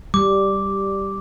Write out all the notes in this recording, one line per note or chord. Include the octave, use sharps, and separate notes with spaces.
G3 D6